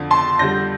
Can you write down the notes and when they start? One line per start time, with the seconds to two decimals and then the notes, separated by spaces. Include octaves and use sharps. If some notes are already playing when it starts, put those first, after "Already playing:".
Already playing: F2 D3 F3
0.11 A5 C6
0.39 F2 D3 G3 G6 A#6